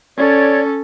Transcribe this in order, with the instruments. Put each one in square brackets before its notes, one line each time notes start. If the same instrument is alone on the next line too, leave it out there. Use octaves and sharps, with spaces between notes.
[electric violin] C#4 A4 [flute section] C#5 D5 G#6